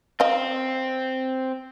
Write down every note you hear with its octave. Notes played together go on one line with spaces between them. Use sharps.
C4 D#5 F5